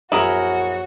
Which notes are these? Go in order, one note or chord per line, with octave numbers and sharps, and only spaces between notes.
A#1 F#2 E4 F#4 G#4 A#4 C#5